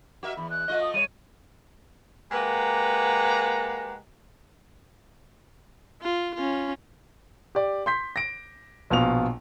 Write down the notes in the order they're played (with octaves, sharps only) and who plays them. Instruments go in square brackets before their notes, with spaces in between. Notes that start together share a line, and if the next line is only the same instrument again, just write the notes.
[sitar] F#4 A#4 E5
[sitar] E2 [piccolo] B5
[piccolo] F#6
[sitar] A3 F4 D#5
[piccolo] D#6
[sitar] G3 C#5 [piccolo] D#7
[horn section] G#3 A#3 G4 B4 F#5 A#5
[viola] F4
C#4 F4
[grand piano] G4 D5
C6 G6 B6
A#6 D7
A#1 B2 F4 F7